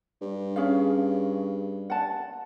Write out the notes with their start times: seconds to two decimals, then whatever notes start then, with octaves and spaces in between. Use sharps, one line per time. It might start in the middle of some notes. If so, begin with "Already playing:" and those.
0.21 G2
0.56 C#4 G#4 F5
1.90 F#5 A5